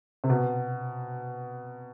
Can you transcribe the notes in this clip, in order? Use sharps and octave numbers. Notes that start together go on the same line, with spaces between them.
C3
B2